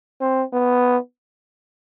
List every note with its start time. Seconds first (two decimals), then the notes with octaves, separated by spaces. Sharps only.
0.21 C4
0.53 B3